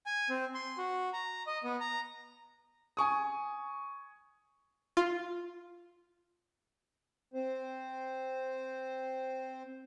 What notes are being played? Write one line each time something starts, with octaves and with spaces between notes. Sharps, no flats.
G#5
C4
C6
F#4
A#5
D#5
B3
A#5
G#5 C#6 D#6
F4
C4 C5